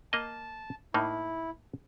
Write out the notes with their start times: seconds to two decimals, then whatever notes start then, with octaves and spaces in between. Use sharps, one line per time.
0.13 A#3 D#5 A5
0.94 A2 A#3 D#4 E4